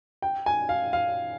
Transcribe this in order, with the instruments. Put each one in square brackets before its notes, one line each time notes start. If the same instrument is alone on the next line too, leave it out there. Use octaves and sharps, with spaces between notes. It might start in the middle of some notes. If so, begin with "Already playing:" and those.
[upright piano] G5
G#5
F5
F5